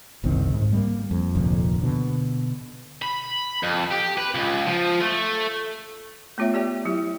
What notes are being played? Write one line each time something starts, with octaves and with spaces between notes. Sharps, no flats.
F#1 C2 D#3 C4
G#2
G3 A3 A#3
F2
F1 D2 A#2 F3
B2 D3
B5
F2
G4
B4
C#2
F3
A3
A3 B3 F4 C#5 E5
G4 D5 G5
F#3 E4 G4